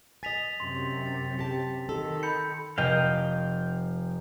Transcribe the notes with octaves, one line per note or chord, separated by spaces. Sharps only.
D#5 G#5 A6 B6 F7
F#2 C3 C6
A6
G4 A5
D#3 A4
B5 G6 C#7
F1 D#5 F5 G5